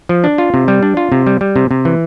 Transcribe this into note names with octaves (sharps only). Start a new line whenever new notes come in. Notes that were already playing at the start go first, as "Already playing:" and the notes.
F3
D4
F4
C3
G3
D4
F4
C3
G3
G3
C3
C3
E3